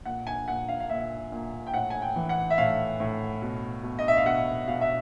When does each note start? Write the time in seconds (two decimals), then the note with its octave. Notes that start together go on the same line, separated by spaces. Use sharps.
0.05 A#2 F#5
0.27 G#5
0.48 A#2 F#5
0.69 F5
0.80 F5
0.89 A#2 E5
1.32 A#2
1.67 G5
1.74 A2 F#5
1.90 G#5
2.02 G5
2.16 E3
2.29 F#5
2.50 E5
2.58 A2 F5
3.00 A2
3.42 B2
3.83 B2
3.99 D#5
4.08 E5
4.17 F5
4.25 B2 F#5
4.67 B2 F5
4.81 E5